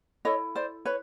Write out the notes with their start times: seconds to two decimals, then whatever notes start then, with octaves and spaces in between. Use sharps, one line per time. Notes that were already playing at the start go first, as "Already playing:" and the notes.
0.25 E4 A4 C#5 D#5
0.55 C5 D5
0.85 B4 C#5